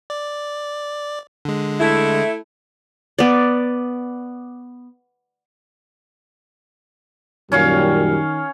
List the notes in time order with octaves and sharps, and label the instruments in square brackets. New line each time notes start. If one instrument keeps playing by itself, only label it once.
[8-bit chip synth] D5
D3 G#3
[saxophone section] A3 E4
[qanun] B3 D5
[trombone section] F#2 A#2 G3 [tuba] D#3 [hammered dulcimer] C#4 C#5 F5